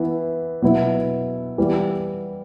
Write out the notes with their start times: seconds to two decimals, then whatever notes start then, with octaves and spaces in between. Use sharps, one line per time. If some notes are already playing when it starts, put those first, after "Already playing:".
Already playing: E3 B3 E4
0.62 B2 F#3 B3 E4
1.58 E3 G3 B3